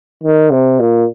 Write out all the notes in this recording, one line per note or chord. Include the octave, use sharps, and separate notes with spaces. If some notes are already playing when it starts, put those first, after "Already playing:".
D#3
C3
A#2